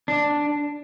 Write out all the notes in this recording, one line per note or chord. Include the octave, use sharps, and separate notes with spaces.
D4